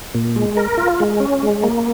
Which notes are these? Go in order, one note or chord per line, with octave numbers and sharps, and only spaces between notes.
A#2
G#3
A#4
F4
G#3
C#4
G#3
A#3